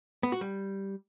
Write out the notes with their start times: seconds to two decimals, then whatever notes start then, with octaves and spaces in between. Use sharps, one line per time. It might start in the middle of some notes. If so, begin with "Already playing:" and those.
0.23 B3
0.32 F#4
0.41 G3